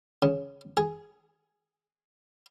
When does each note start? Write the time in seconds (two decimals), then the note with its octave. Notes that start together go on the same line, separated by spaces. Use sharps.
0.22 C#3
0.77 G#4